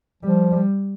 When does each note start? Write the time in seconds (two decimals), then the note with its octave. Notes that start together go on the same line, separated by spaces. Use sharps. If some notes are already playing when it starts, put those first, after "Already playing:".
0.23 F3 G3
0.52 G3